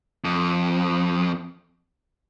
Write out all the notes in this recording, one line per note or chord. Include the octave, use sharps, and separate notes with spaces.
F2